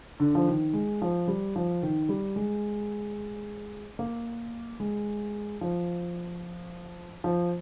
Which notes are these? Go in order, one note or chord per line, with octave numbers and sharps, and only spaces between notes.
D3
F3
D#3
G#3
F3
G3
F3
D#3
G3
G#3
A#3
G#3
F3
F3